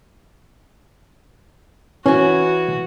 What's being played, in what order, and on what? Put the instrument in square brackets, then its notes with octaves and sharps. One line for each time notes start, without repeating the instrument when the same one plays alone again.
[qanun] E3 G#5 [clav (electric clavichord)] C#4 [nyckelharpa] F#4